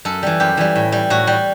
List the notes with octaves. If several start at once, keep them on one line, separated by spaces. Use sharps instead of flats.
F#2 A4
E3 G3
F#2 G4
E3 G3
A2
G3
A2 F#4
G3